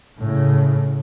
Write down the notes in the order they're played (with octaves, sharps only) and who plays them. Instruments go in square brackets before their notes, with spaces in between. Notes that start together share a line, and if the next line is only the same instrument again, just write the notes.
[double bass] A2 C#3